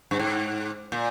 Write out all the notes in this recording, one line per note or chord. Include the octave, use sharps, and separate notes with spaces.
G2
G#2
A#2